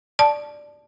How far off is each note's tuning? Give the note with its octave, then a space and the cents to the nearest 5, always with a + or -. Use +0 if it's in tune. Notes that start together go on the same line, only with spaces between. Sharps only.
D5 +0 A5 +0